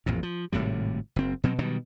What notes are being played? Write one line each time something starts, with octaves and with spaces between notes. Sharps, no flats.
A1 F2 A#2
F3
G#1 A2 C3 G3
F#1 C4
B2 F#3 C4
B2 D#3 F#3 G3